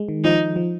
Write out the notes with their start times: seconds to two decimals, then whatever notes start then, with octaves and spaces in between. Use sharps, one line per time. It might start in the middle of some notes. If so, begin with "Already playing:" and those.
Already playing: G#3
0.08 D#3
0.24 F3 D#4
0.56 F3